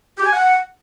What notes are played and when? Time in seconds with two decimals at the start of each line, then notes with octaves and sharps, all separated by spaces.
0.18 G4
0.25 G#5
0.33 F#5